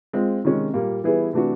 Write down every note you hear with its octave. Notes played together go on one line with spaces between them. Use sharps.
G#3 C4 F4
C3 D#3 G#3 C#4
A#2 G3 A#3
E3 G3 B3 E4 G#4
C3 E3 A3 D4 F#4